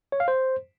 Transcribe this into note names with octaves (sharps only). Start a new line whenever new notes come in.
C#5
F5
C5